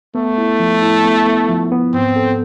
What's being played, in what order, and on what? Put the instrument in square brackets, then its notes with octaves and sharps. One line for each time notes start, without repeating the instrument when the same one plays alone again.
[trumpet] A3 [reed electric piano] B3
[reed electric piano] E4
F3
E4
B3
B3
F3
B3
[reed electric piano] G#2 [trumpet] C4
[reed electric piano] A4